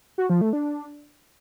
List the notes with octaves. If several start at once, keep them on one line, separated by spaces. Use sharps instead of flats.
F#4
F3
A3
D4